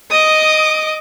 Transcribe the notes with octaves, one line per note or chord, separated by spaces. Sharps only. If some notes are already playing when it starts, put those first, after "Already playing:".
D#5 D6 D#6